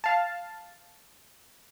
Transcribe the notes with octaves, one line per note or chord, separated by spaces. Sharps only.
F5 A5